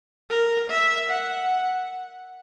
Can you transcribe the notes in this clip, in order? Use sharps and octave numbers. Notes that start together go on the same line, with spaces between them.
A#4
E5
F#5